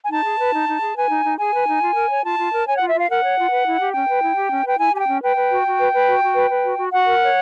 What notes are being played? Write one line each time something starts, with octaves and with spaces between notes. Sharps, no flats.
G#5
D#4 A5
G#4
B4
D#4
D#4
G#4
B4 G#5
D#4
D#4
G#4 G#5
B4
D#4
F4
A#4
C#5
F4 A5
F4
A#4
C#5 G#5
F4 F#5
E5
F4 F5
A#4 F#5
C#5
F4
B4
E4
G4
C#4 G5
B4
E4
G4
C#4
B4 G5
E4 G#5
G4 G#5
G5
C#4
B4 G5
B4
F#4
F#4
B4
B4
F#4
F#4
B4
B4
F#4
F#4
F#4 F#5
A#4
C#5